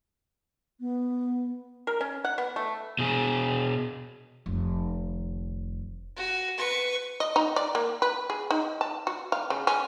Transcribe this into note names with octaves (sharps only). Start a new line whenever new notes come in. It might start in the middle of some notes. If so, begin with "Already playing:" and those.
B3
A#4
C#4
F#5
B3
A3
B2 G#4
F1 D#3
F#4
B4 C#6
D#5
D#4
D5
A#3
B4
G#4
D#4
A5
F#4
F5
C#3
C#4